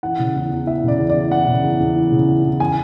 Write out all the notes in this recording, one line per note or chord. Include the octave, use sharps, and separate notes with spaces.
E3 F#5
C#3
E2
E2
E3 E5
C#3 D5
E2
D5
E2
E3 F#5
C#3
E2
E2
E3
C#3
E2
E2
E3 G#5